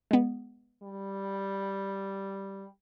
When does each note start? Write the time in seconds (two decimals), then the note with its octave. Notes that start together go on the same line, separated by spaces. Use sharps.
0.11 G#3 B3
0.83 G3